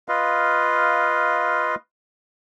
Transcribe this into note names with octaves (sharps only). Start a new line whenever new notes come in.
F4 B4 D#5 F5